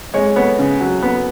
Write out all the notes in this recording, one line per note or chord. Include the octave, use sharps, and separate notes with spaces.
G#3 C#5
B3 C#5
C#3
F#3
B3